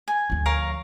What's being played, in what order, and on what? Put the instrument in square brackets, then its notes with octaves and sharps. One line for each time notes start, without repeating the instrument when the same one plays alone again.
[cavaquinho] G#5
[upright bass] D2 F3
[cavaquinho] A#4 C#5 F5